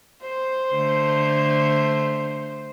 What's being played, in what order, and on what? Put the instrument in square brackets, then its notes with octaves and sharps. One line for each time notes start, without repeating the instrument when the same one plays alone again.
[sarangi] C5
[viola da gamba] D3 A3